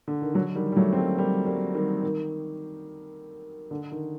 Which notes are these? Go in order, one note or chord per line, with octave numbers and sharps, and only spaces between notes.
D3
D#3
D3 F#3
D#3 G3
G3
F#3 A3
C4
G3 A#3
G3 A#3
G3 A#3
D#3 G3
D#3
D3
D#3